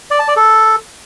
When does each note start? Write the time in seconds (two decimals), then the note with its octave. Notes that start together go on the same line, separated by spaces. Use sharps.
0.11 D5
0.19 A5
0.28 D5
0.37 A4